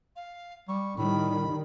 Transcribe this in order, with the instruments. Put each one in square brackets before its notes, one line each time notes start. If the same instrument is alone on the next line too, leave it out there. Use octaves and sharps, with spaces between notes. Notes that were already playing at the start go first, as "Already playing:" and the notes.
[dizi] F5
[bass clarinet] G3 [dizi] C#6
[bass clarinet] A2 [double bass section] D#3 G3 [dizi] B5